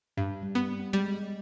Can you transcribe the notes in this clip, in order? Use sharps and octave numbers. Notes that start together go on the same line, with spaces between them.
G2 G3
G3
B3
G3 G#3